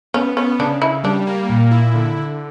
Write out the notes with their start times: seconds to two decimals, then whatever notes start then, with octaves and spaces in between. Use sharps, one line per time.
0.14 B3 C#4
0.37 B3 C#4
0.59 C#3 D4
0.82 C#3 E4
1.04 G3 D4
1.27 A#3
1.50 A#2
1.71 E4
1.94 D3
2.17 D3